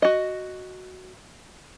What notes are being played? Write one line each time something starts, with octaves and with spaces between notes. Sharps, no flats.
F#4 D#5